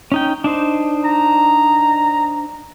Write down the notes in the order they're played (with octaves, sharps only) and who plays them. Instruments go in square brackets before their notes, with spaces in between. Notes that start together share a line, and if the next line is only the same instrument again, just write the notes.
[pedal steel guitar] C#4 D#4 G5
D4 D#4 C5
[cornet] A#5